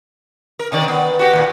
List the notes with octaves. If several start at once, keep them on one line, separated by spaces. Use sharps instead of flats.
A#4
C3 D#3 D5
B3
F#4 G4
D#2 A#2